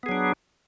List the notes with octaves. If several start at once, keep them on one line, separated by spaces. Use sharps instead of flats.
F#3 B3 D4 G#4